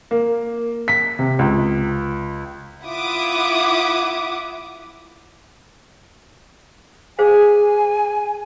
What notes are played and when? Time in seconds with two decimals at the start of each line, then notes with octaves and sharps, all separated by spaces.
0.11 A#3
0.88 B6
1.19 C3
1.39 C#2
2.84 E4 F4 E5 F#5 D6 D#6
7.19 G#4 C5 F5 G#5